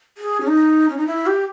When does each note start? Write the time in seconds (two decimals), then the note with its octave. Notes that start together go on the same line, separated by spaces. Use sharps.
0.17 G#4
0.40 C#4
0.47 D#4
0.89 C#4
0.97 D#4
1.06 E4
1.26 G4